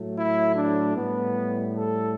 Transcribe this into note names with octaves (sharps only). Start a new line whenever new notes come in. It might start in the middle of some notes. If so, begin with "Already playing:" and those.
Already playing: A2 F#3 A3
E4
D4
A2 G3 B3
A4